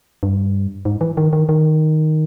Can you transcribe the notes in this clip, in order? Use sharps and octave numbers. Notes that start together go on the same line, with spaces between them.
G2
G#2
E3
D#3
D#3
D#3